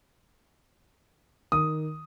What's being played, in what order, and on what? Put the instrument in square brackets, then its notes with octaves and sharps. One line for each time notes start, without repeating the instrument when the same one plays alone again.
[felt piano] D#3 [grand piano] D#6